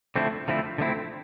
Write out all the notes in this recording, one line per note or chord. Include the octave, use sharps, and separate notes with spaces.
D3 F3 A3 C4 E4
D3 F3 A3 C4 E4
D3 F3 A3 C4 E4